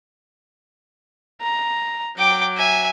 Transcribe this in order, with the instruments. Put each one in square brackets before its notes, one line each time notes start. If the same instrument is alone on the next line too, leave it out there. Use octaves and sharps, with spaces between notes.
[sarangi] A#5
[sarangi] F#3 [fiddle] G5 D6
[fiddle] E5 G#5